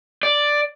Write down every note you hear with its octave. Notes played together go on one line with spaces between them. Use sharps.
D5